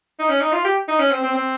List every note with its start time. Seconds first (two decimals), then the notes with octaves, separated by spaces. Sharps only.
0.19 D#4
0.29 C#4
0.40 D#4
0.52 F4
0.65 G4
0.88 D#4
0.99 C#4
1.11 C4
1.23 C4
1.35 C4